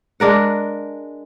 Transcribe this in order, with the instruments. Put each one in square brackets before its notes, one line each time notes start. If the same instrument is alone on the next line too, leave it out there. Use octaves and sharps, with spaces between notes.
[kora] G#3 D4 A#4 F#5